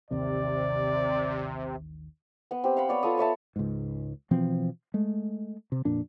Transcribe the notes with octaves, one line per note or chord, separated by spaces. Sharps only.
A1 D#2 C3 D#3 D5
B3 F#5
C4 G4
F5 F#5 B5
B3 C#5 D5
F4 A4 C#6 D#6
A4 C#5 E5 A5
C#2 G#2
B2 E3 F3 C4
G#3 A3
C3
F2 A#2 D4